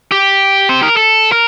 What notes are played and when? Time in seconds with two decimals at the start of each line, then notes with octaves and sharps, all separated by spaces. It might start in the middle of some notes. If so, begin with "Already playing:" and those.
0.11 G4
0.69 C5
0.83 A#4
0.97 A4
1.32 A#4